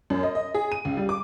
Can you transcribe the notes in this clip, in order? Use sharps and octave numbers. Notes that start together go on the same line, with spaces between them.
F#2
D#5
D#5
G#4
D#7
C#2
G3
D6